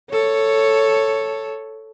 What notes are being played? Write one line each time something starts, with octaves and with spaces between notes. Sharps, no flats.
A4 C#5